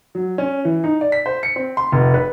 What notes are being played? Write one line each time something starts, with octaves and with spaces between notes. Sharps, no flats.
F#3
C#4
E3
D#4
D5
B6
C5
C#7
C4
C6
F1
B4